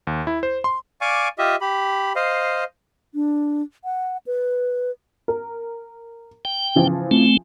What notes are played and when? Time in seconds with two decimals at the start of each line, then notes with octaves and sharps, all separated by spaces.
0.07 D#2
0.27 E4
0.43 C5
0.64 C6
1.01 D5 F5 G#5 C#6 D6
1.38 F4 G4 D#5 E5
1.61 G4 B5
2.16 C5 D#5 F5
3.14 D4
3.84 F#5
4.27 B4
5.28 A#4
6.45 G5
6.75 C#3 E3 F3
7.11 A3 C4